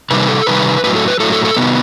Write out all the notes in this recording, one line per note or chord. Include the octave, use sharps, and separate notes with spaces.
C3 D#3 G3 B4
A4
C3 D#3 G3 B4
A2 F#3 B4
A4
B4
A2 F#3 A4
A4
A4
C3 D#3 G3 B3